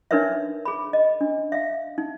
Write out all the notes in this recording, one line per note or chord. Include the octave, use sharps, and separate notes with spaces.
D4 D#4 A#4 B4 C#5 E5
G#4 B5
D#5
D4
E5 F5
D#4